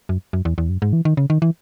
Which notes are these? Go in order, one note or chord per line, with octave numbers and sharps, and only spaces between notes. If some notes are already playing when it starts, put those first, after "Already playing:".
F#2
F#2
E2
E2
F#2
G#2
E3
D#3
C#3
D#3
E3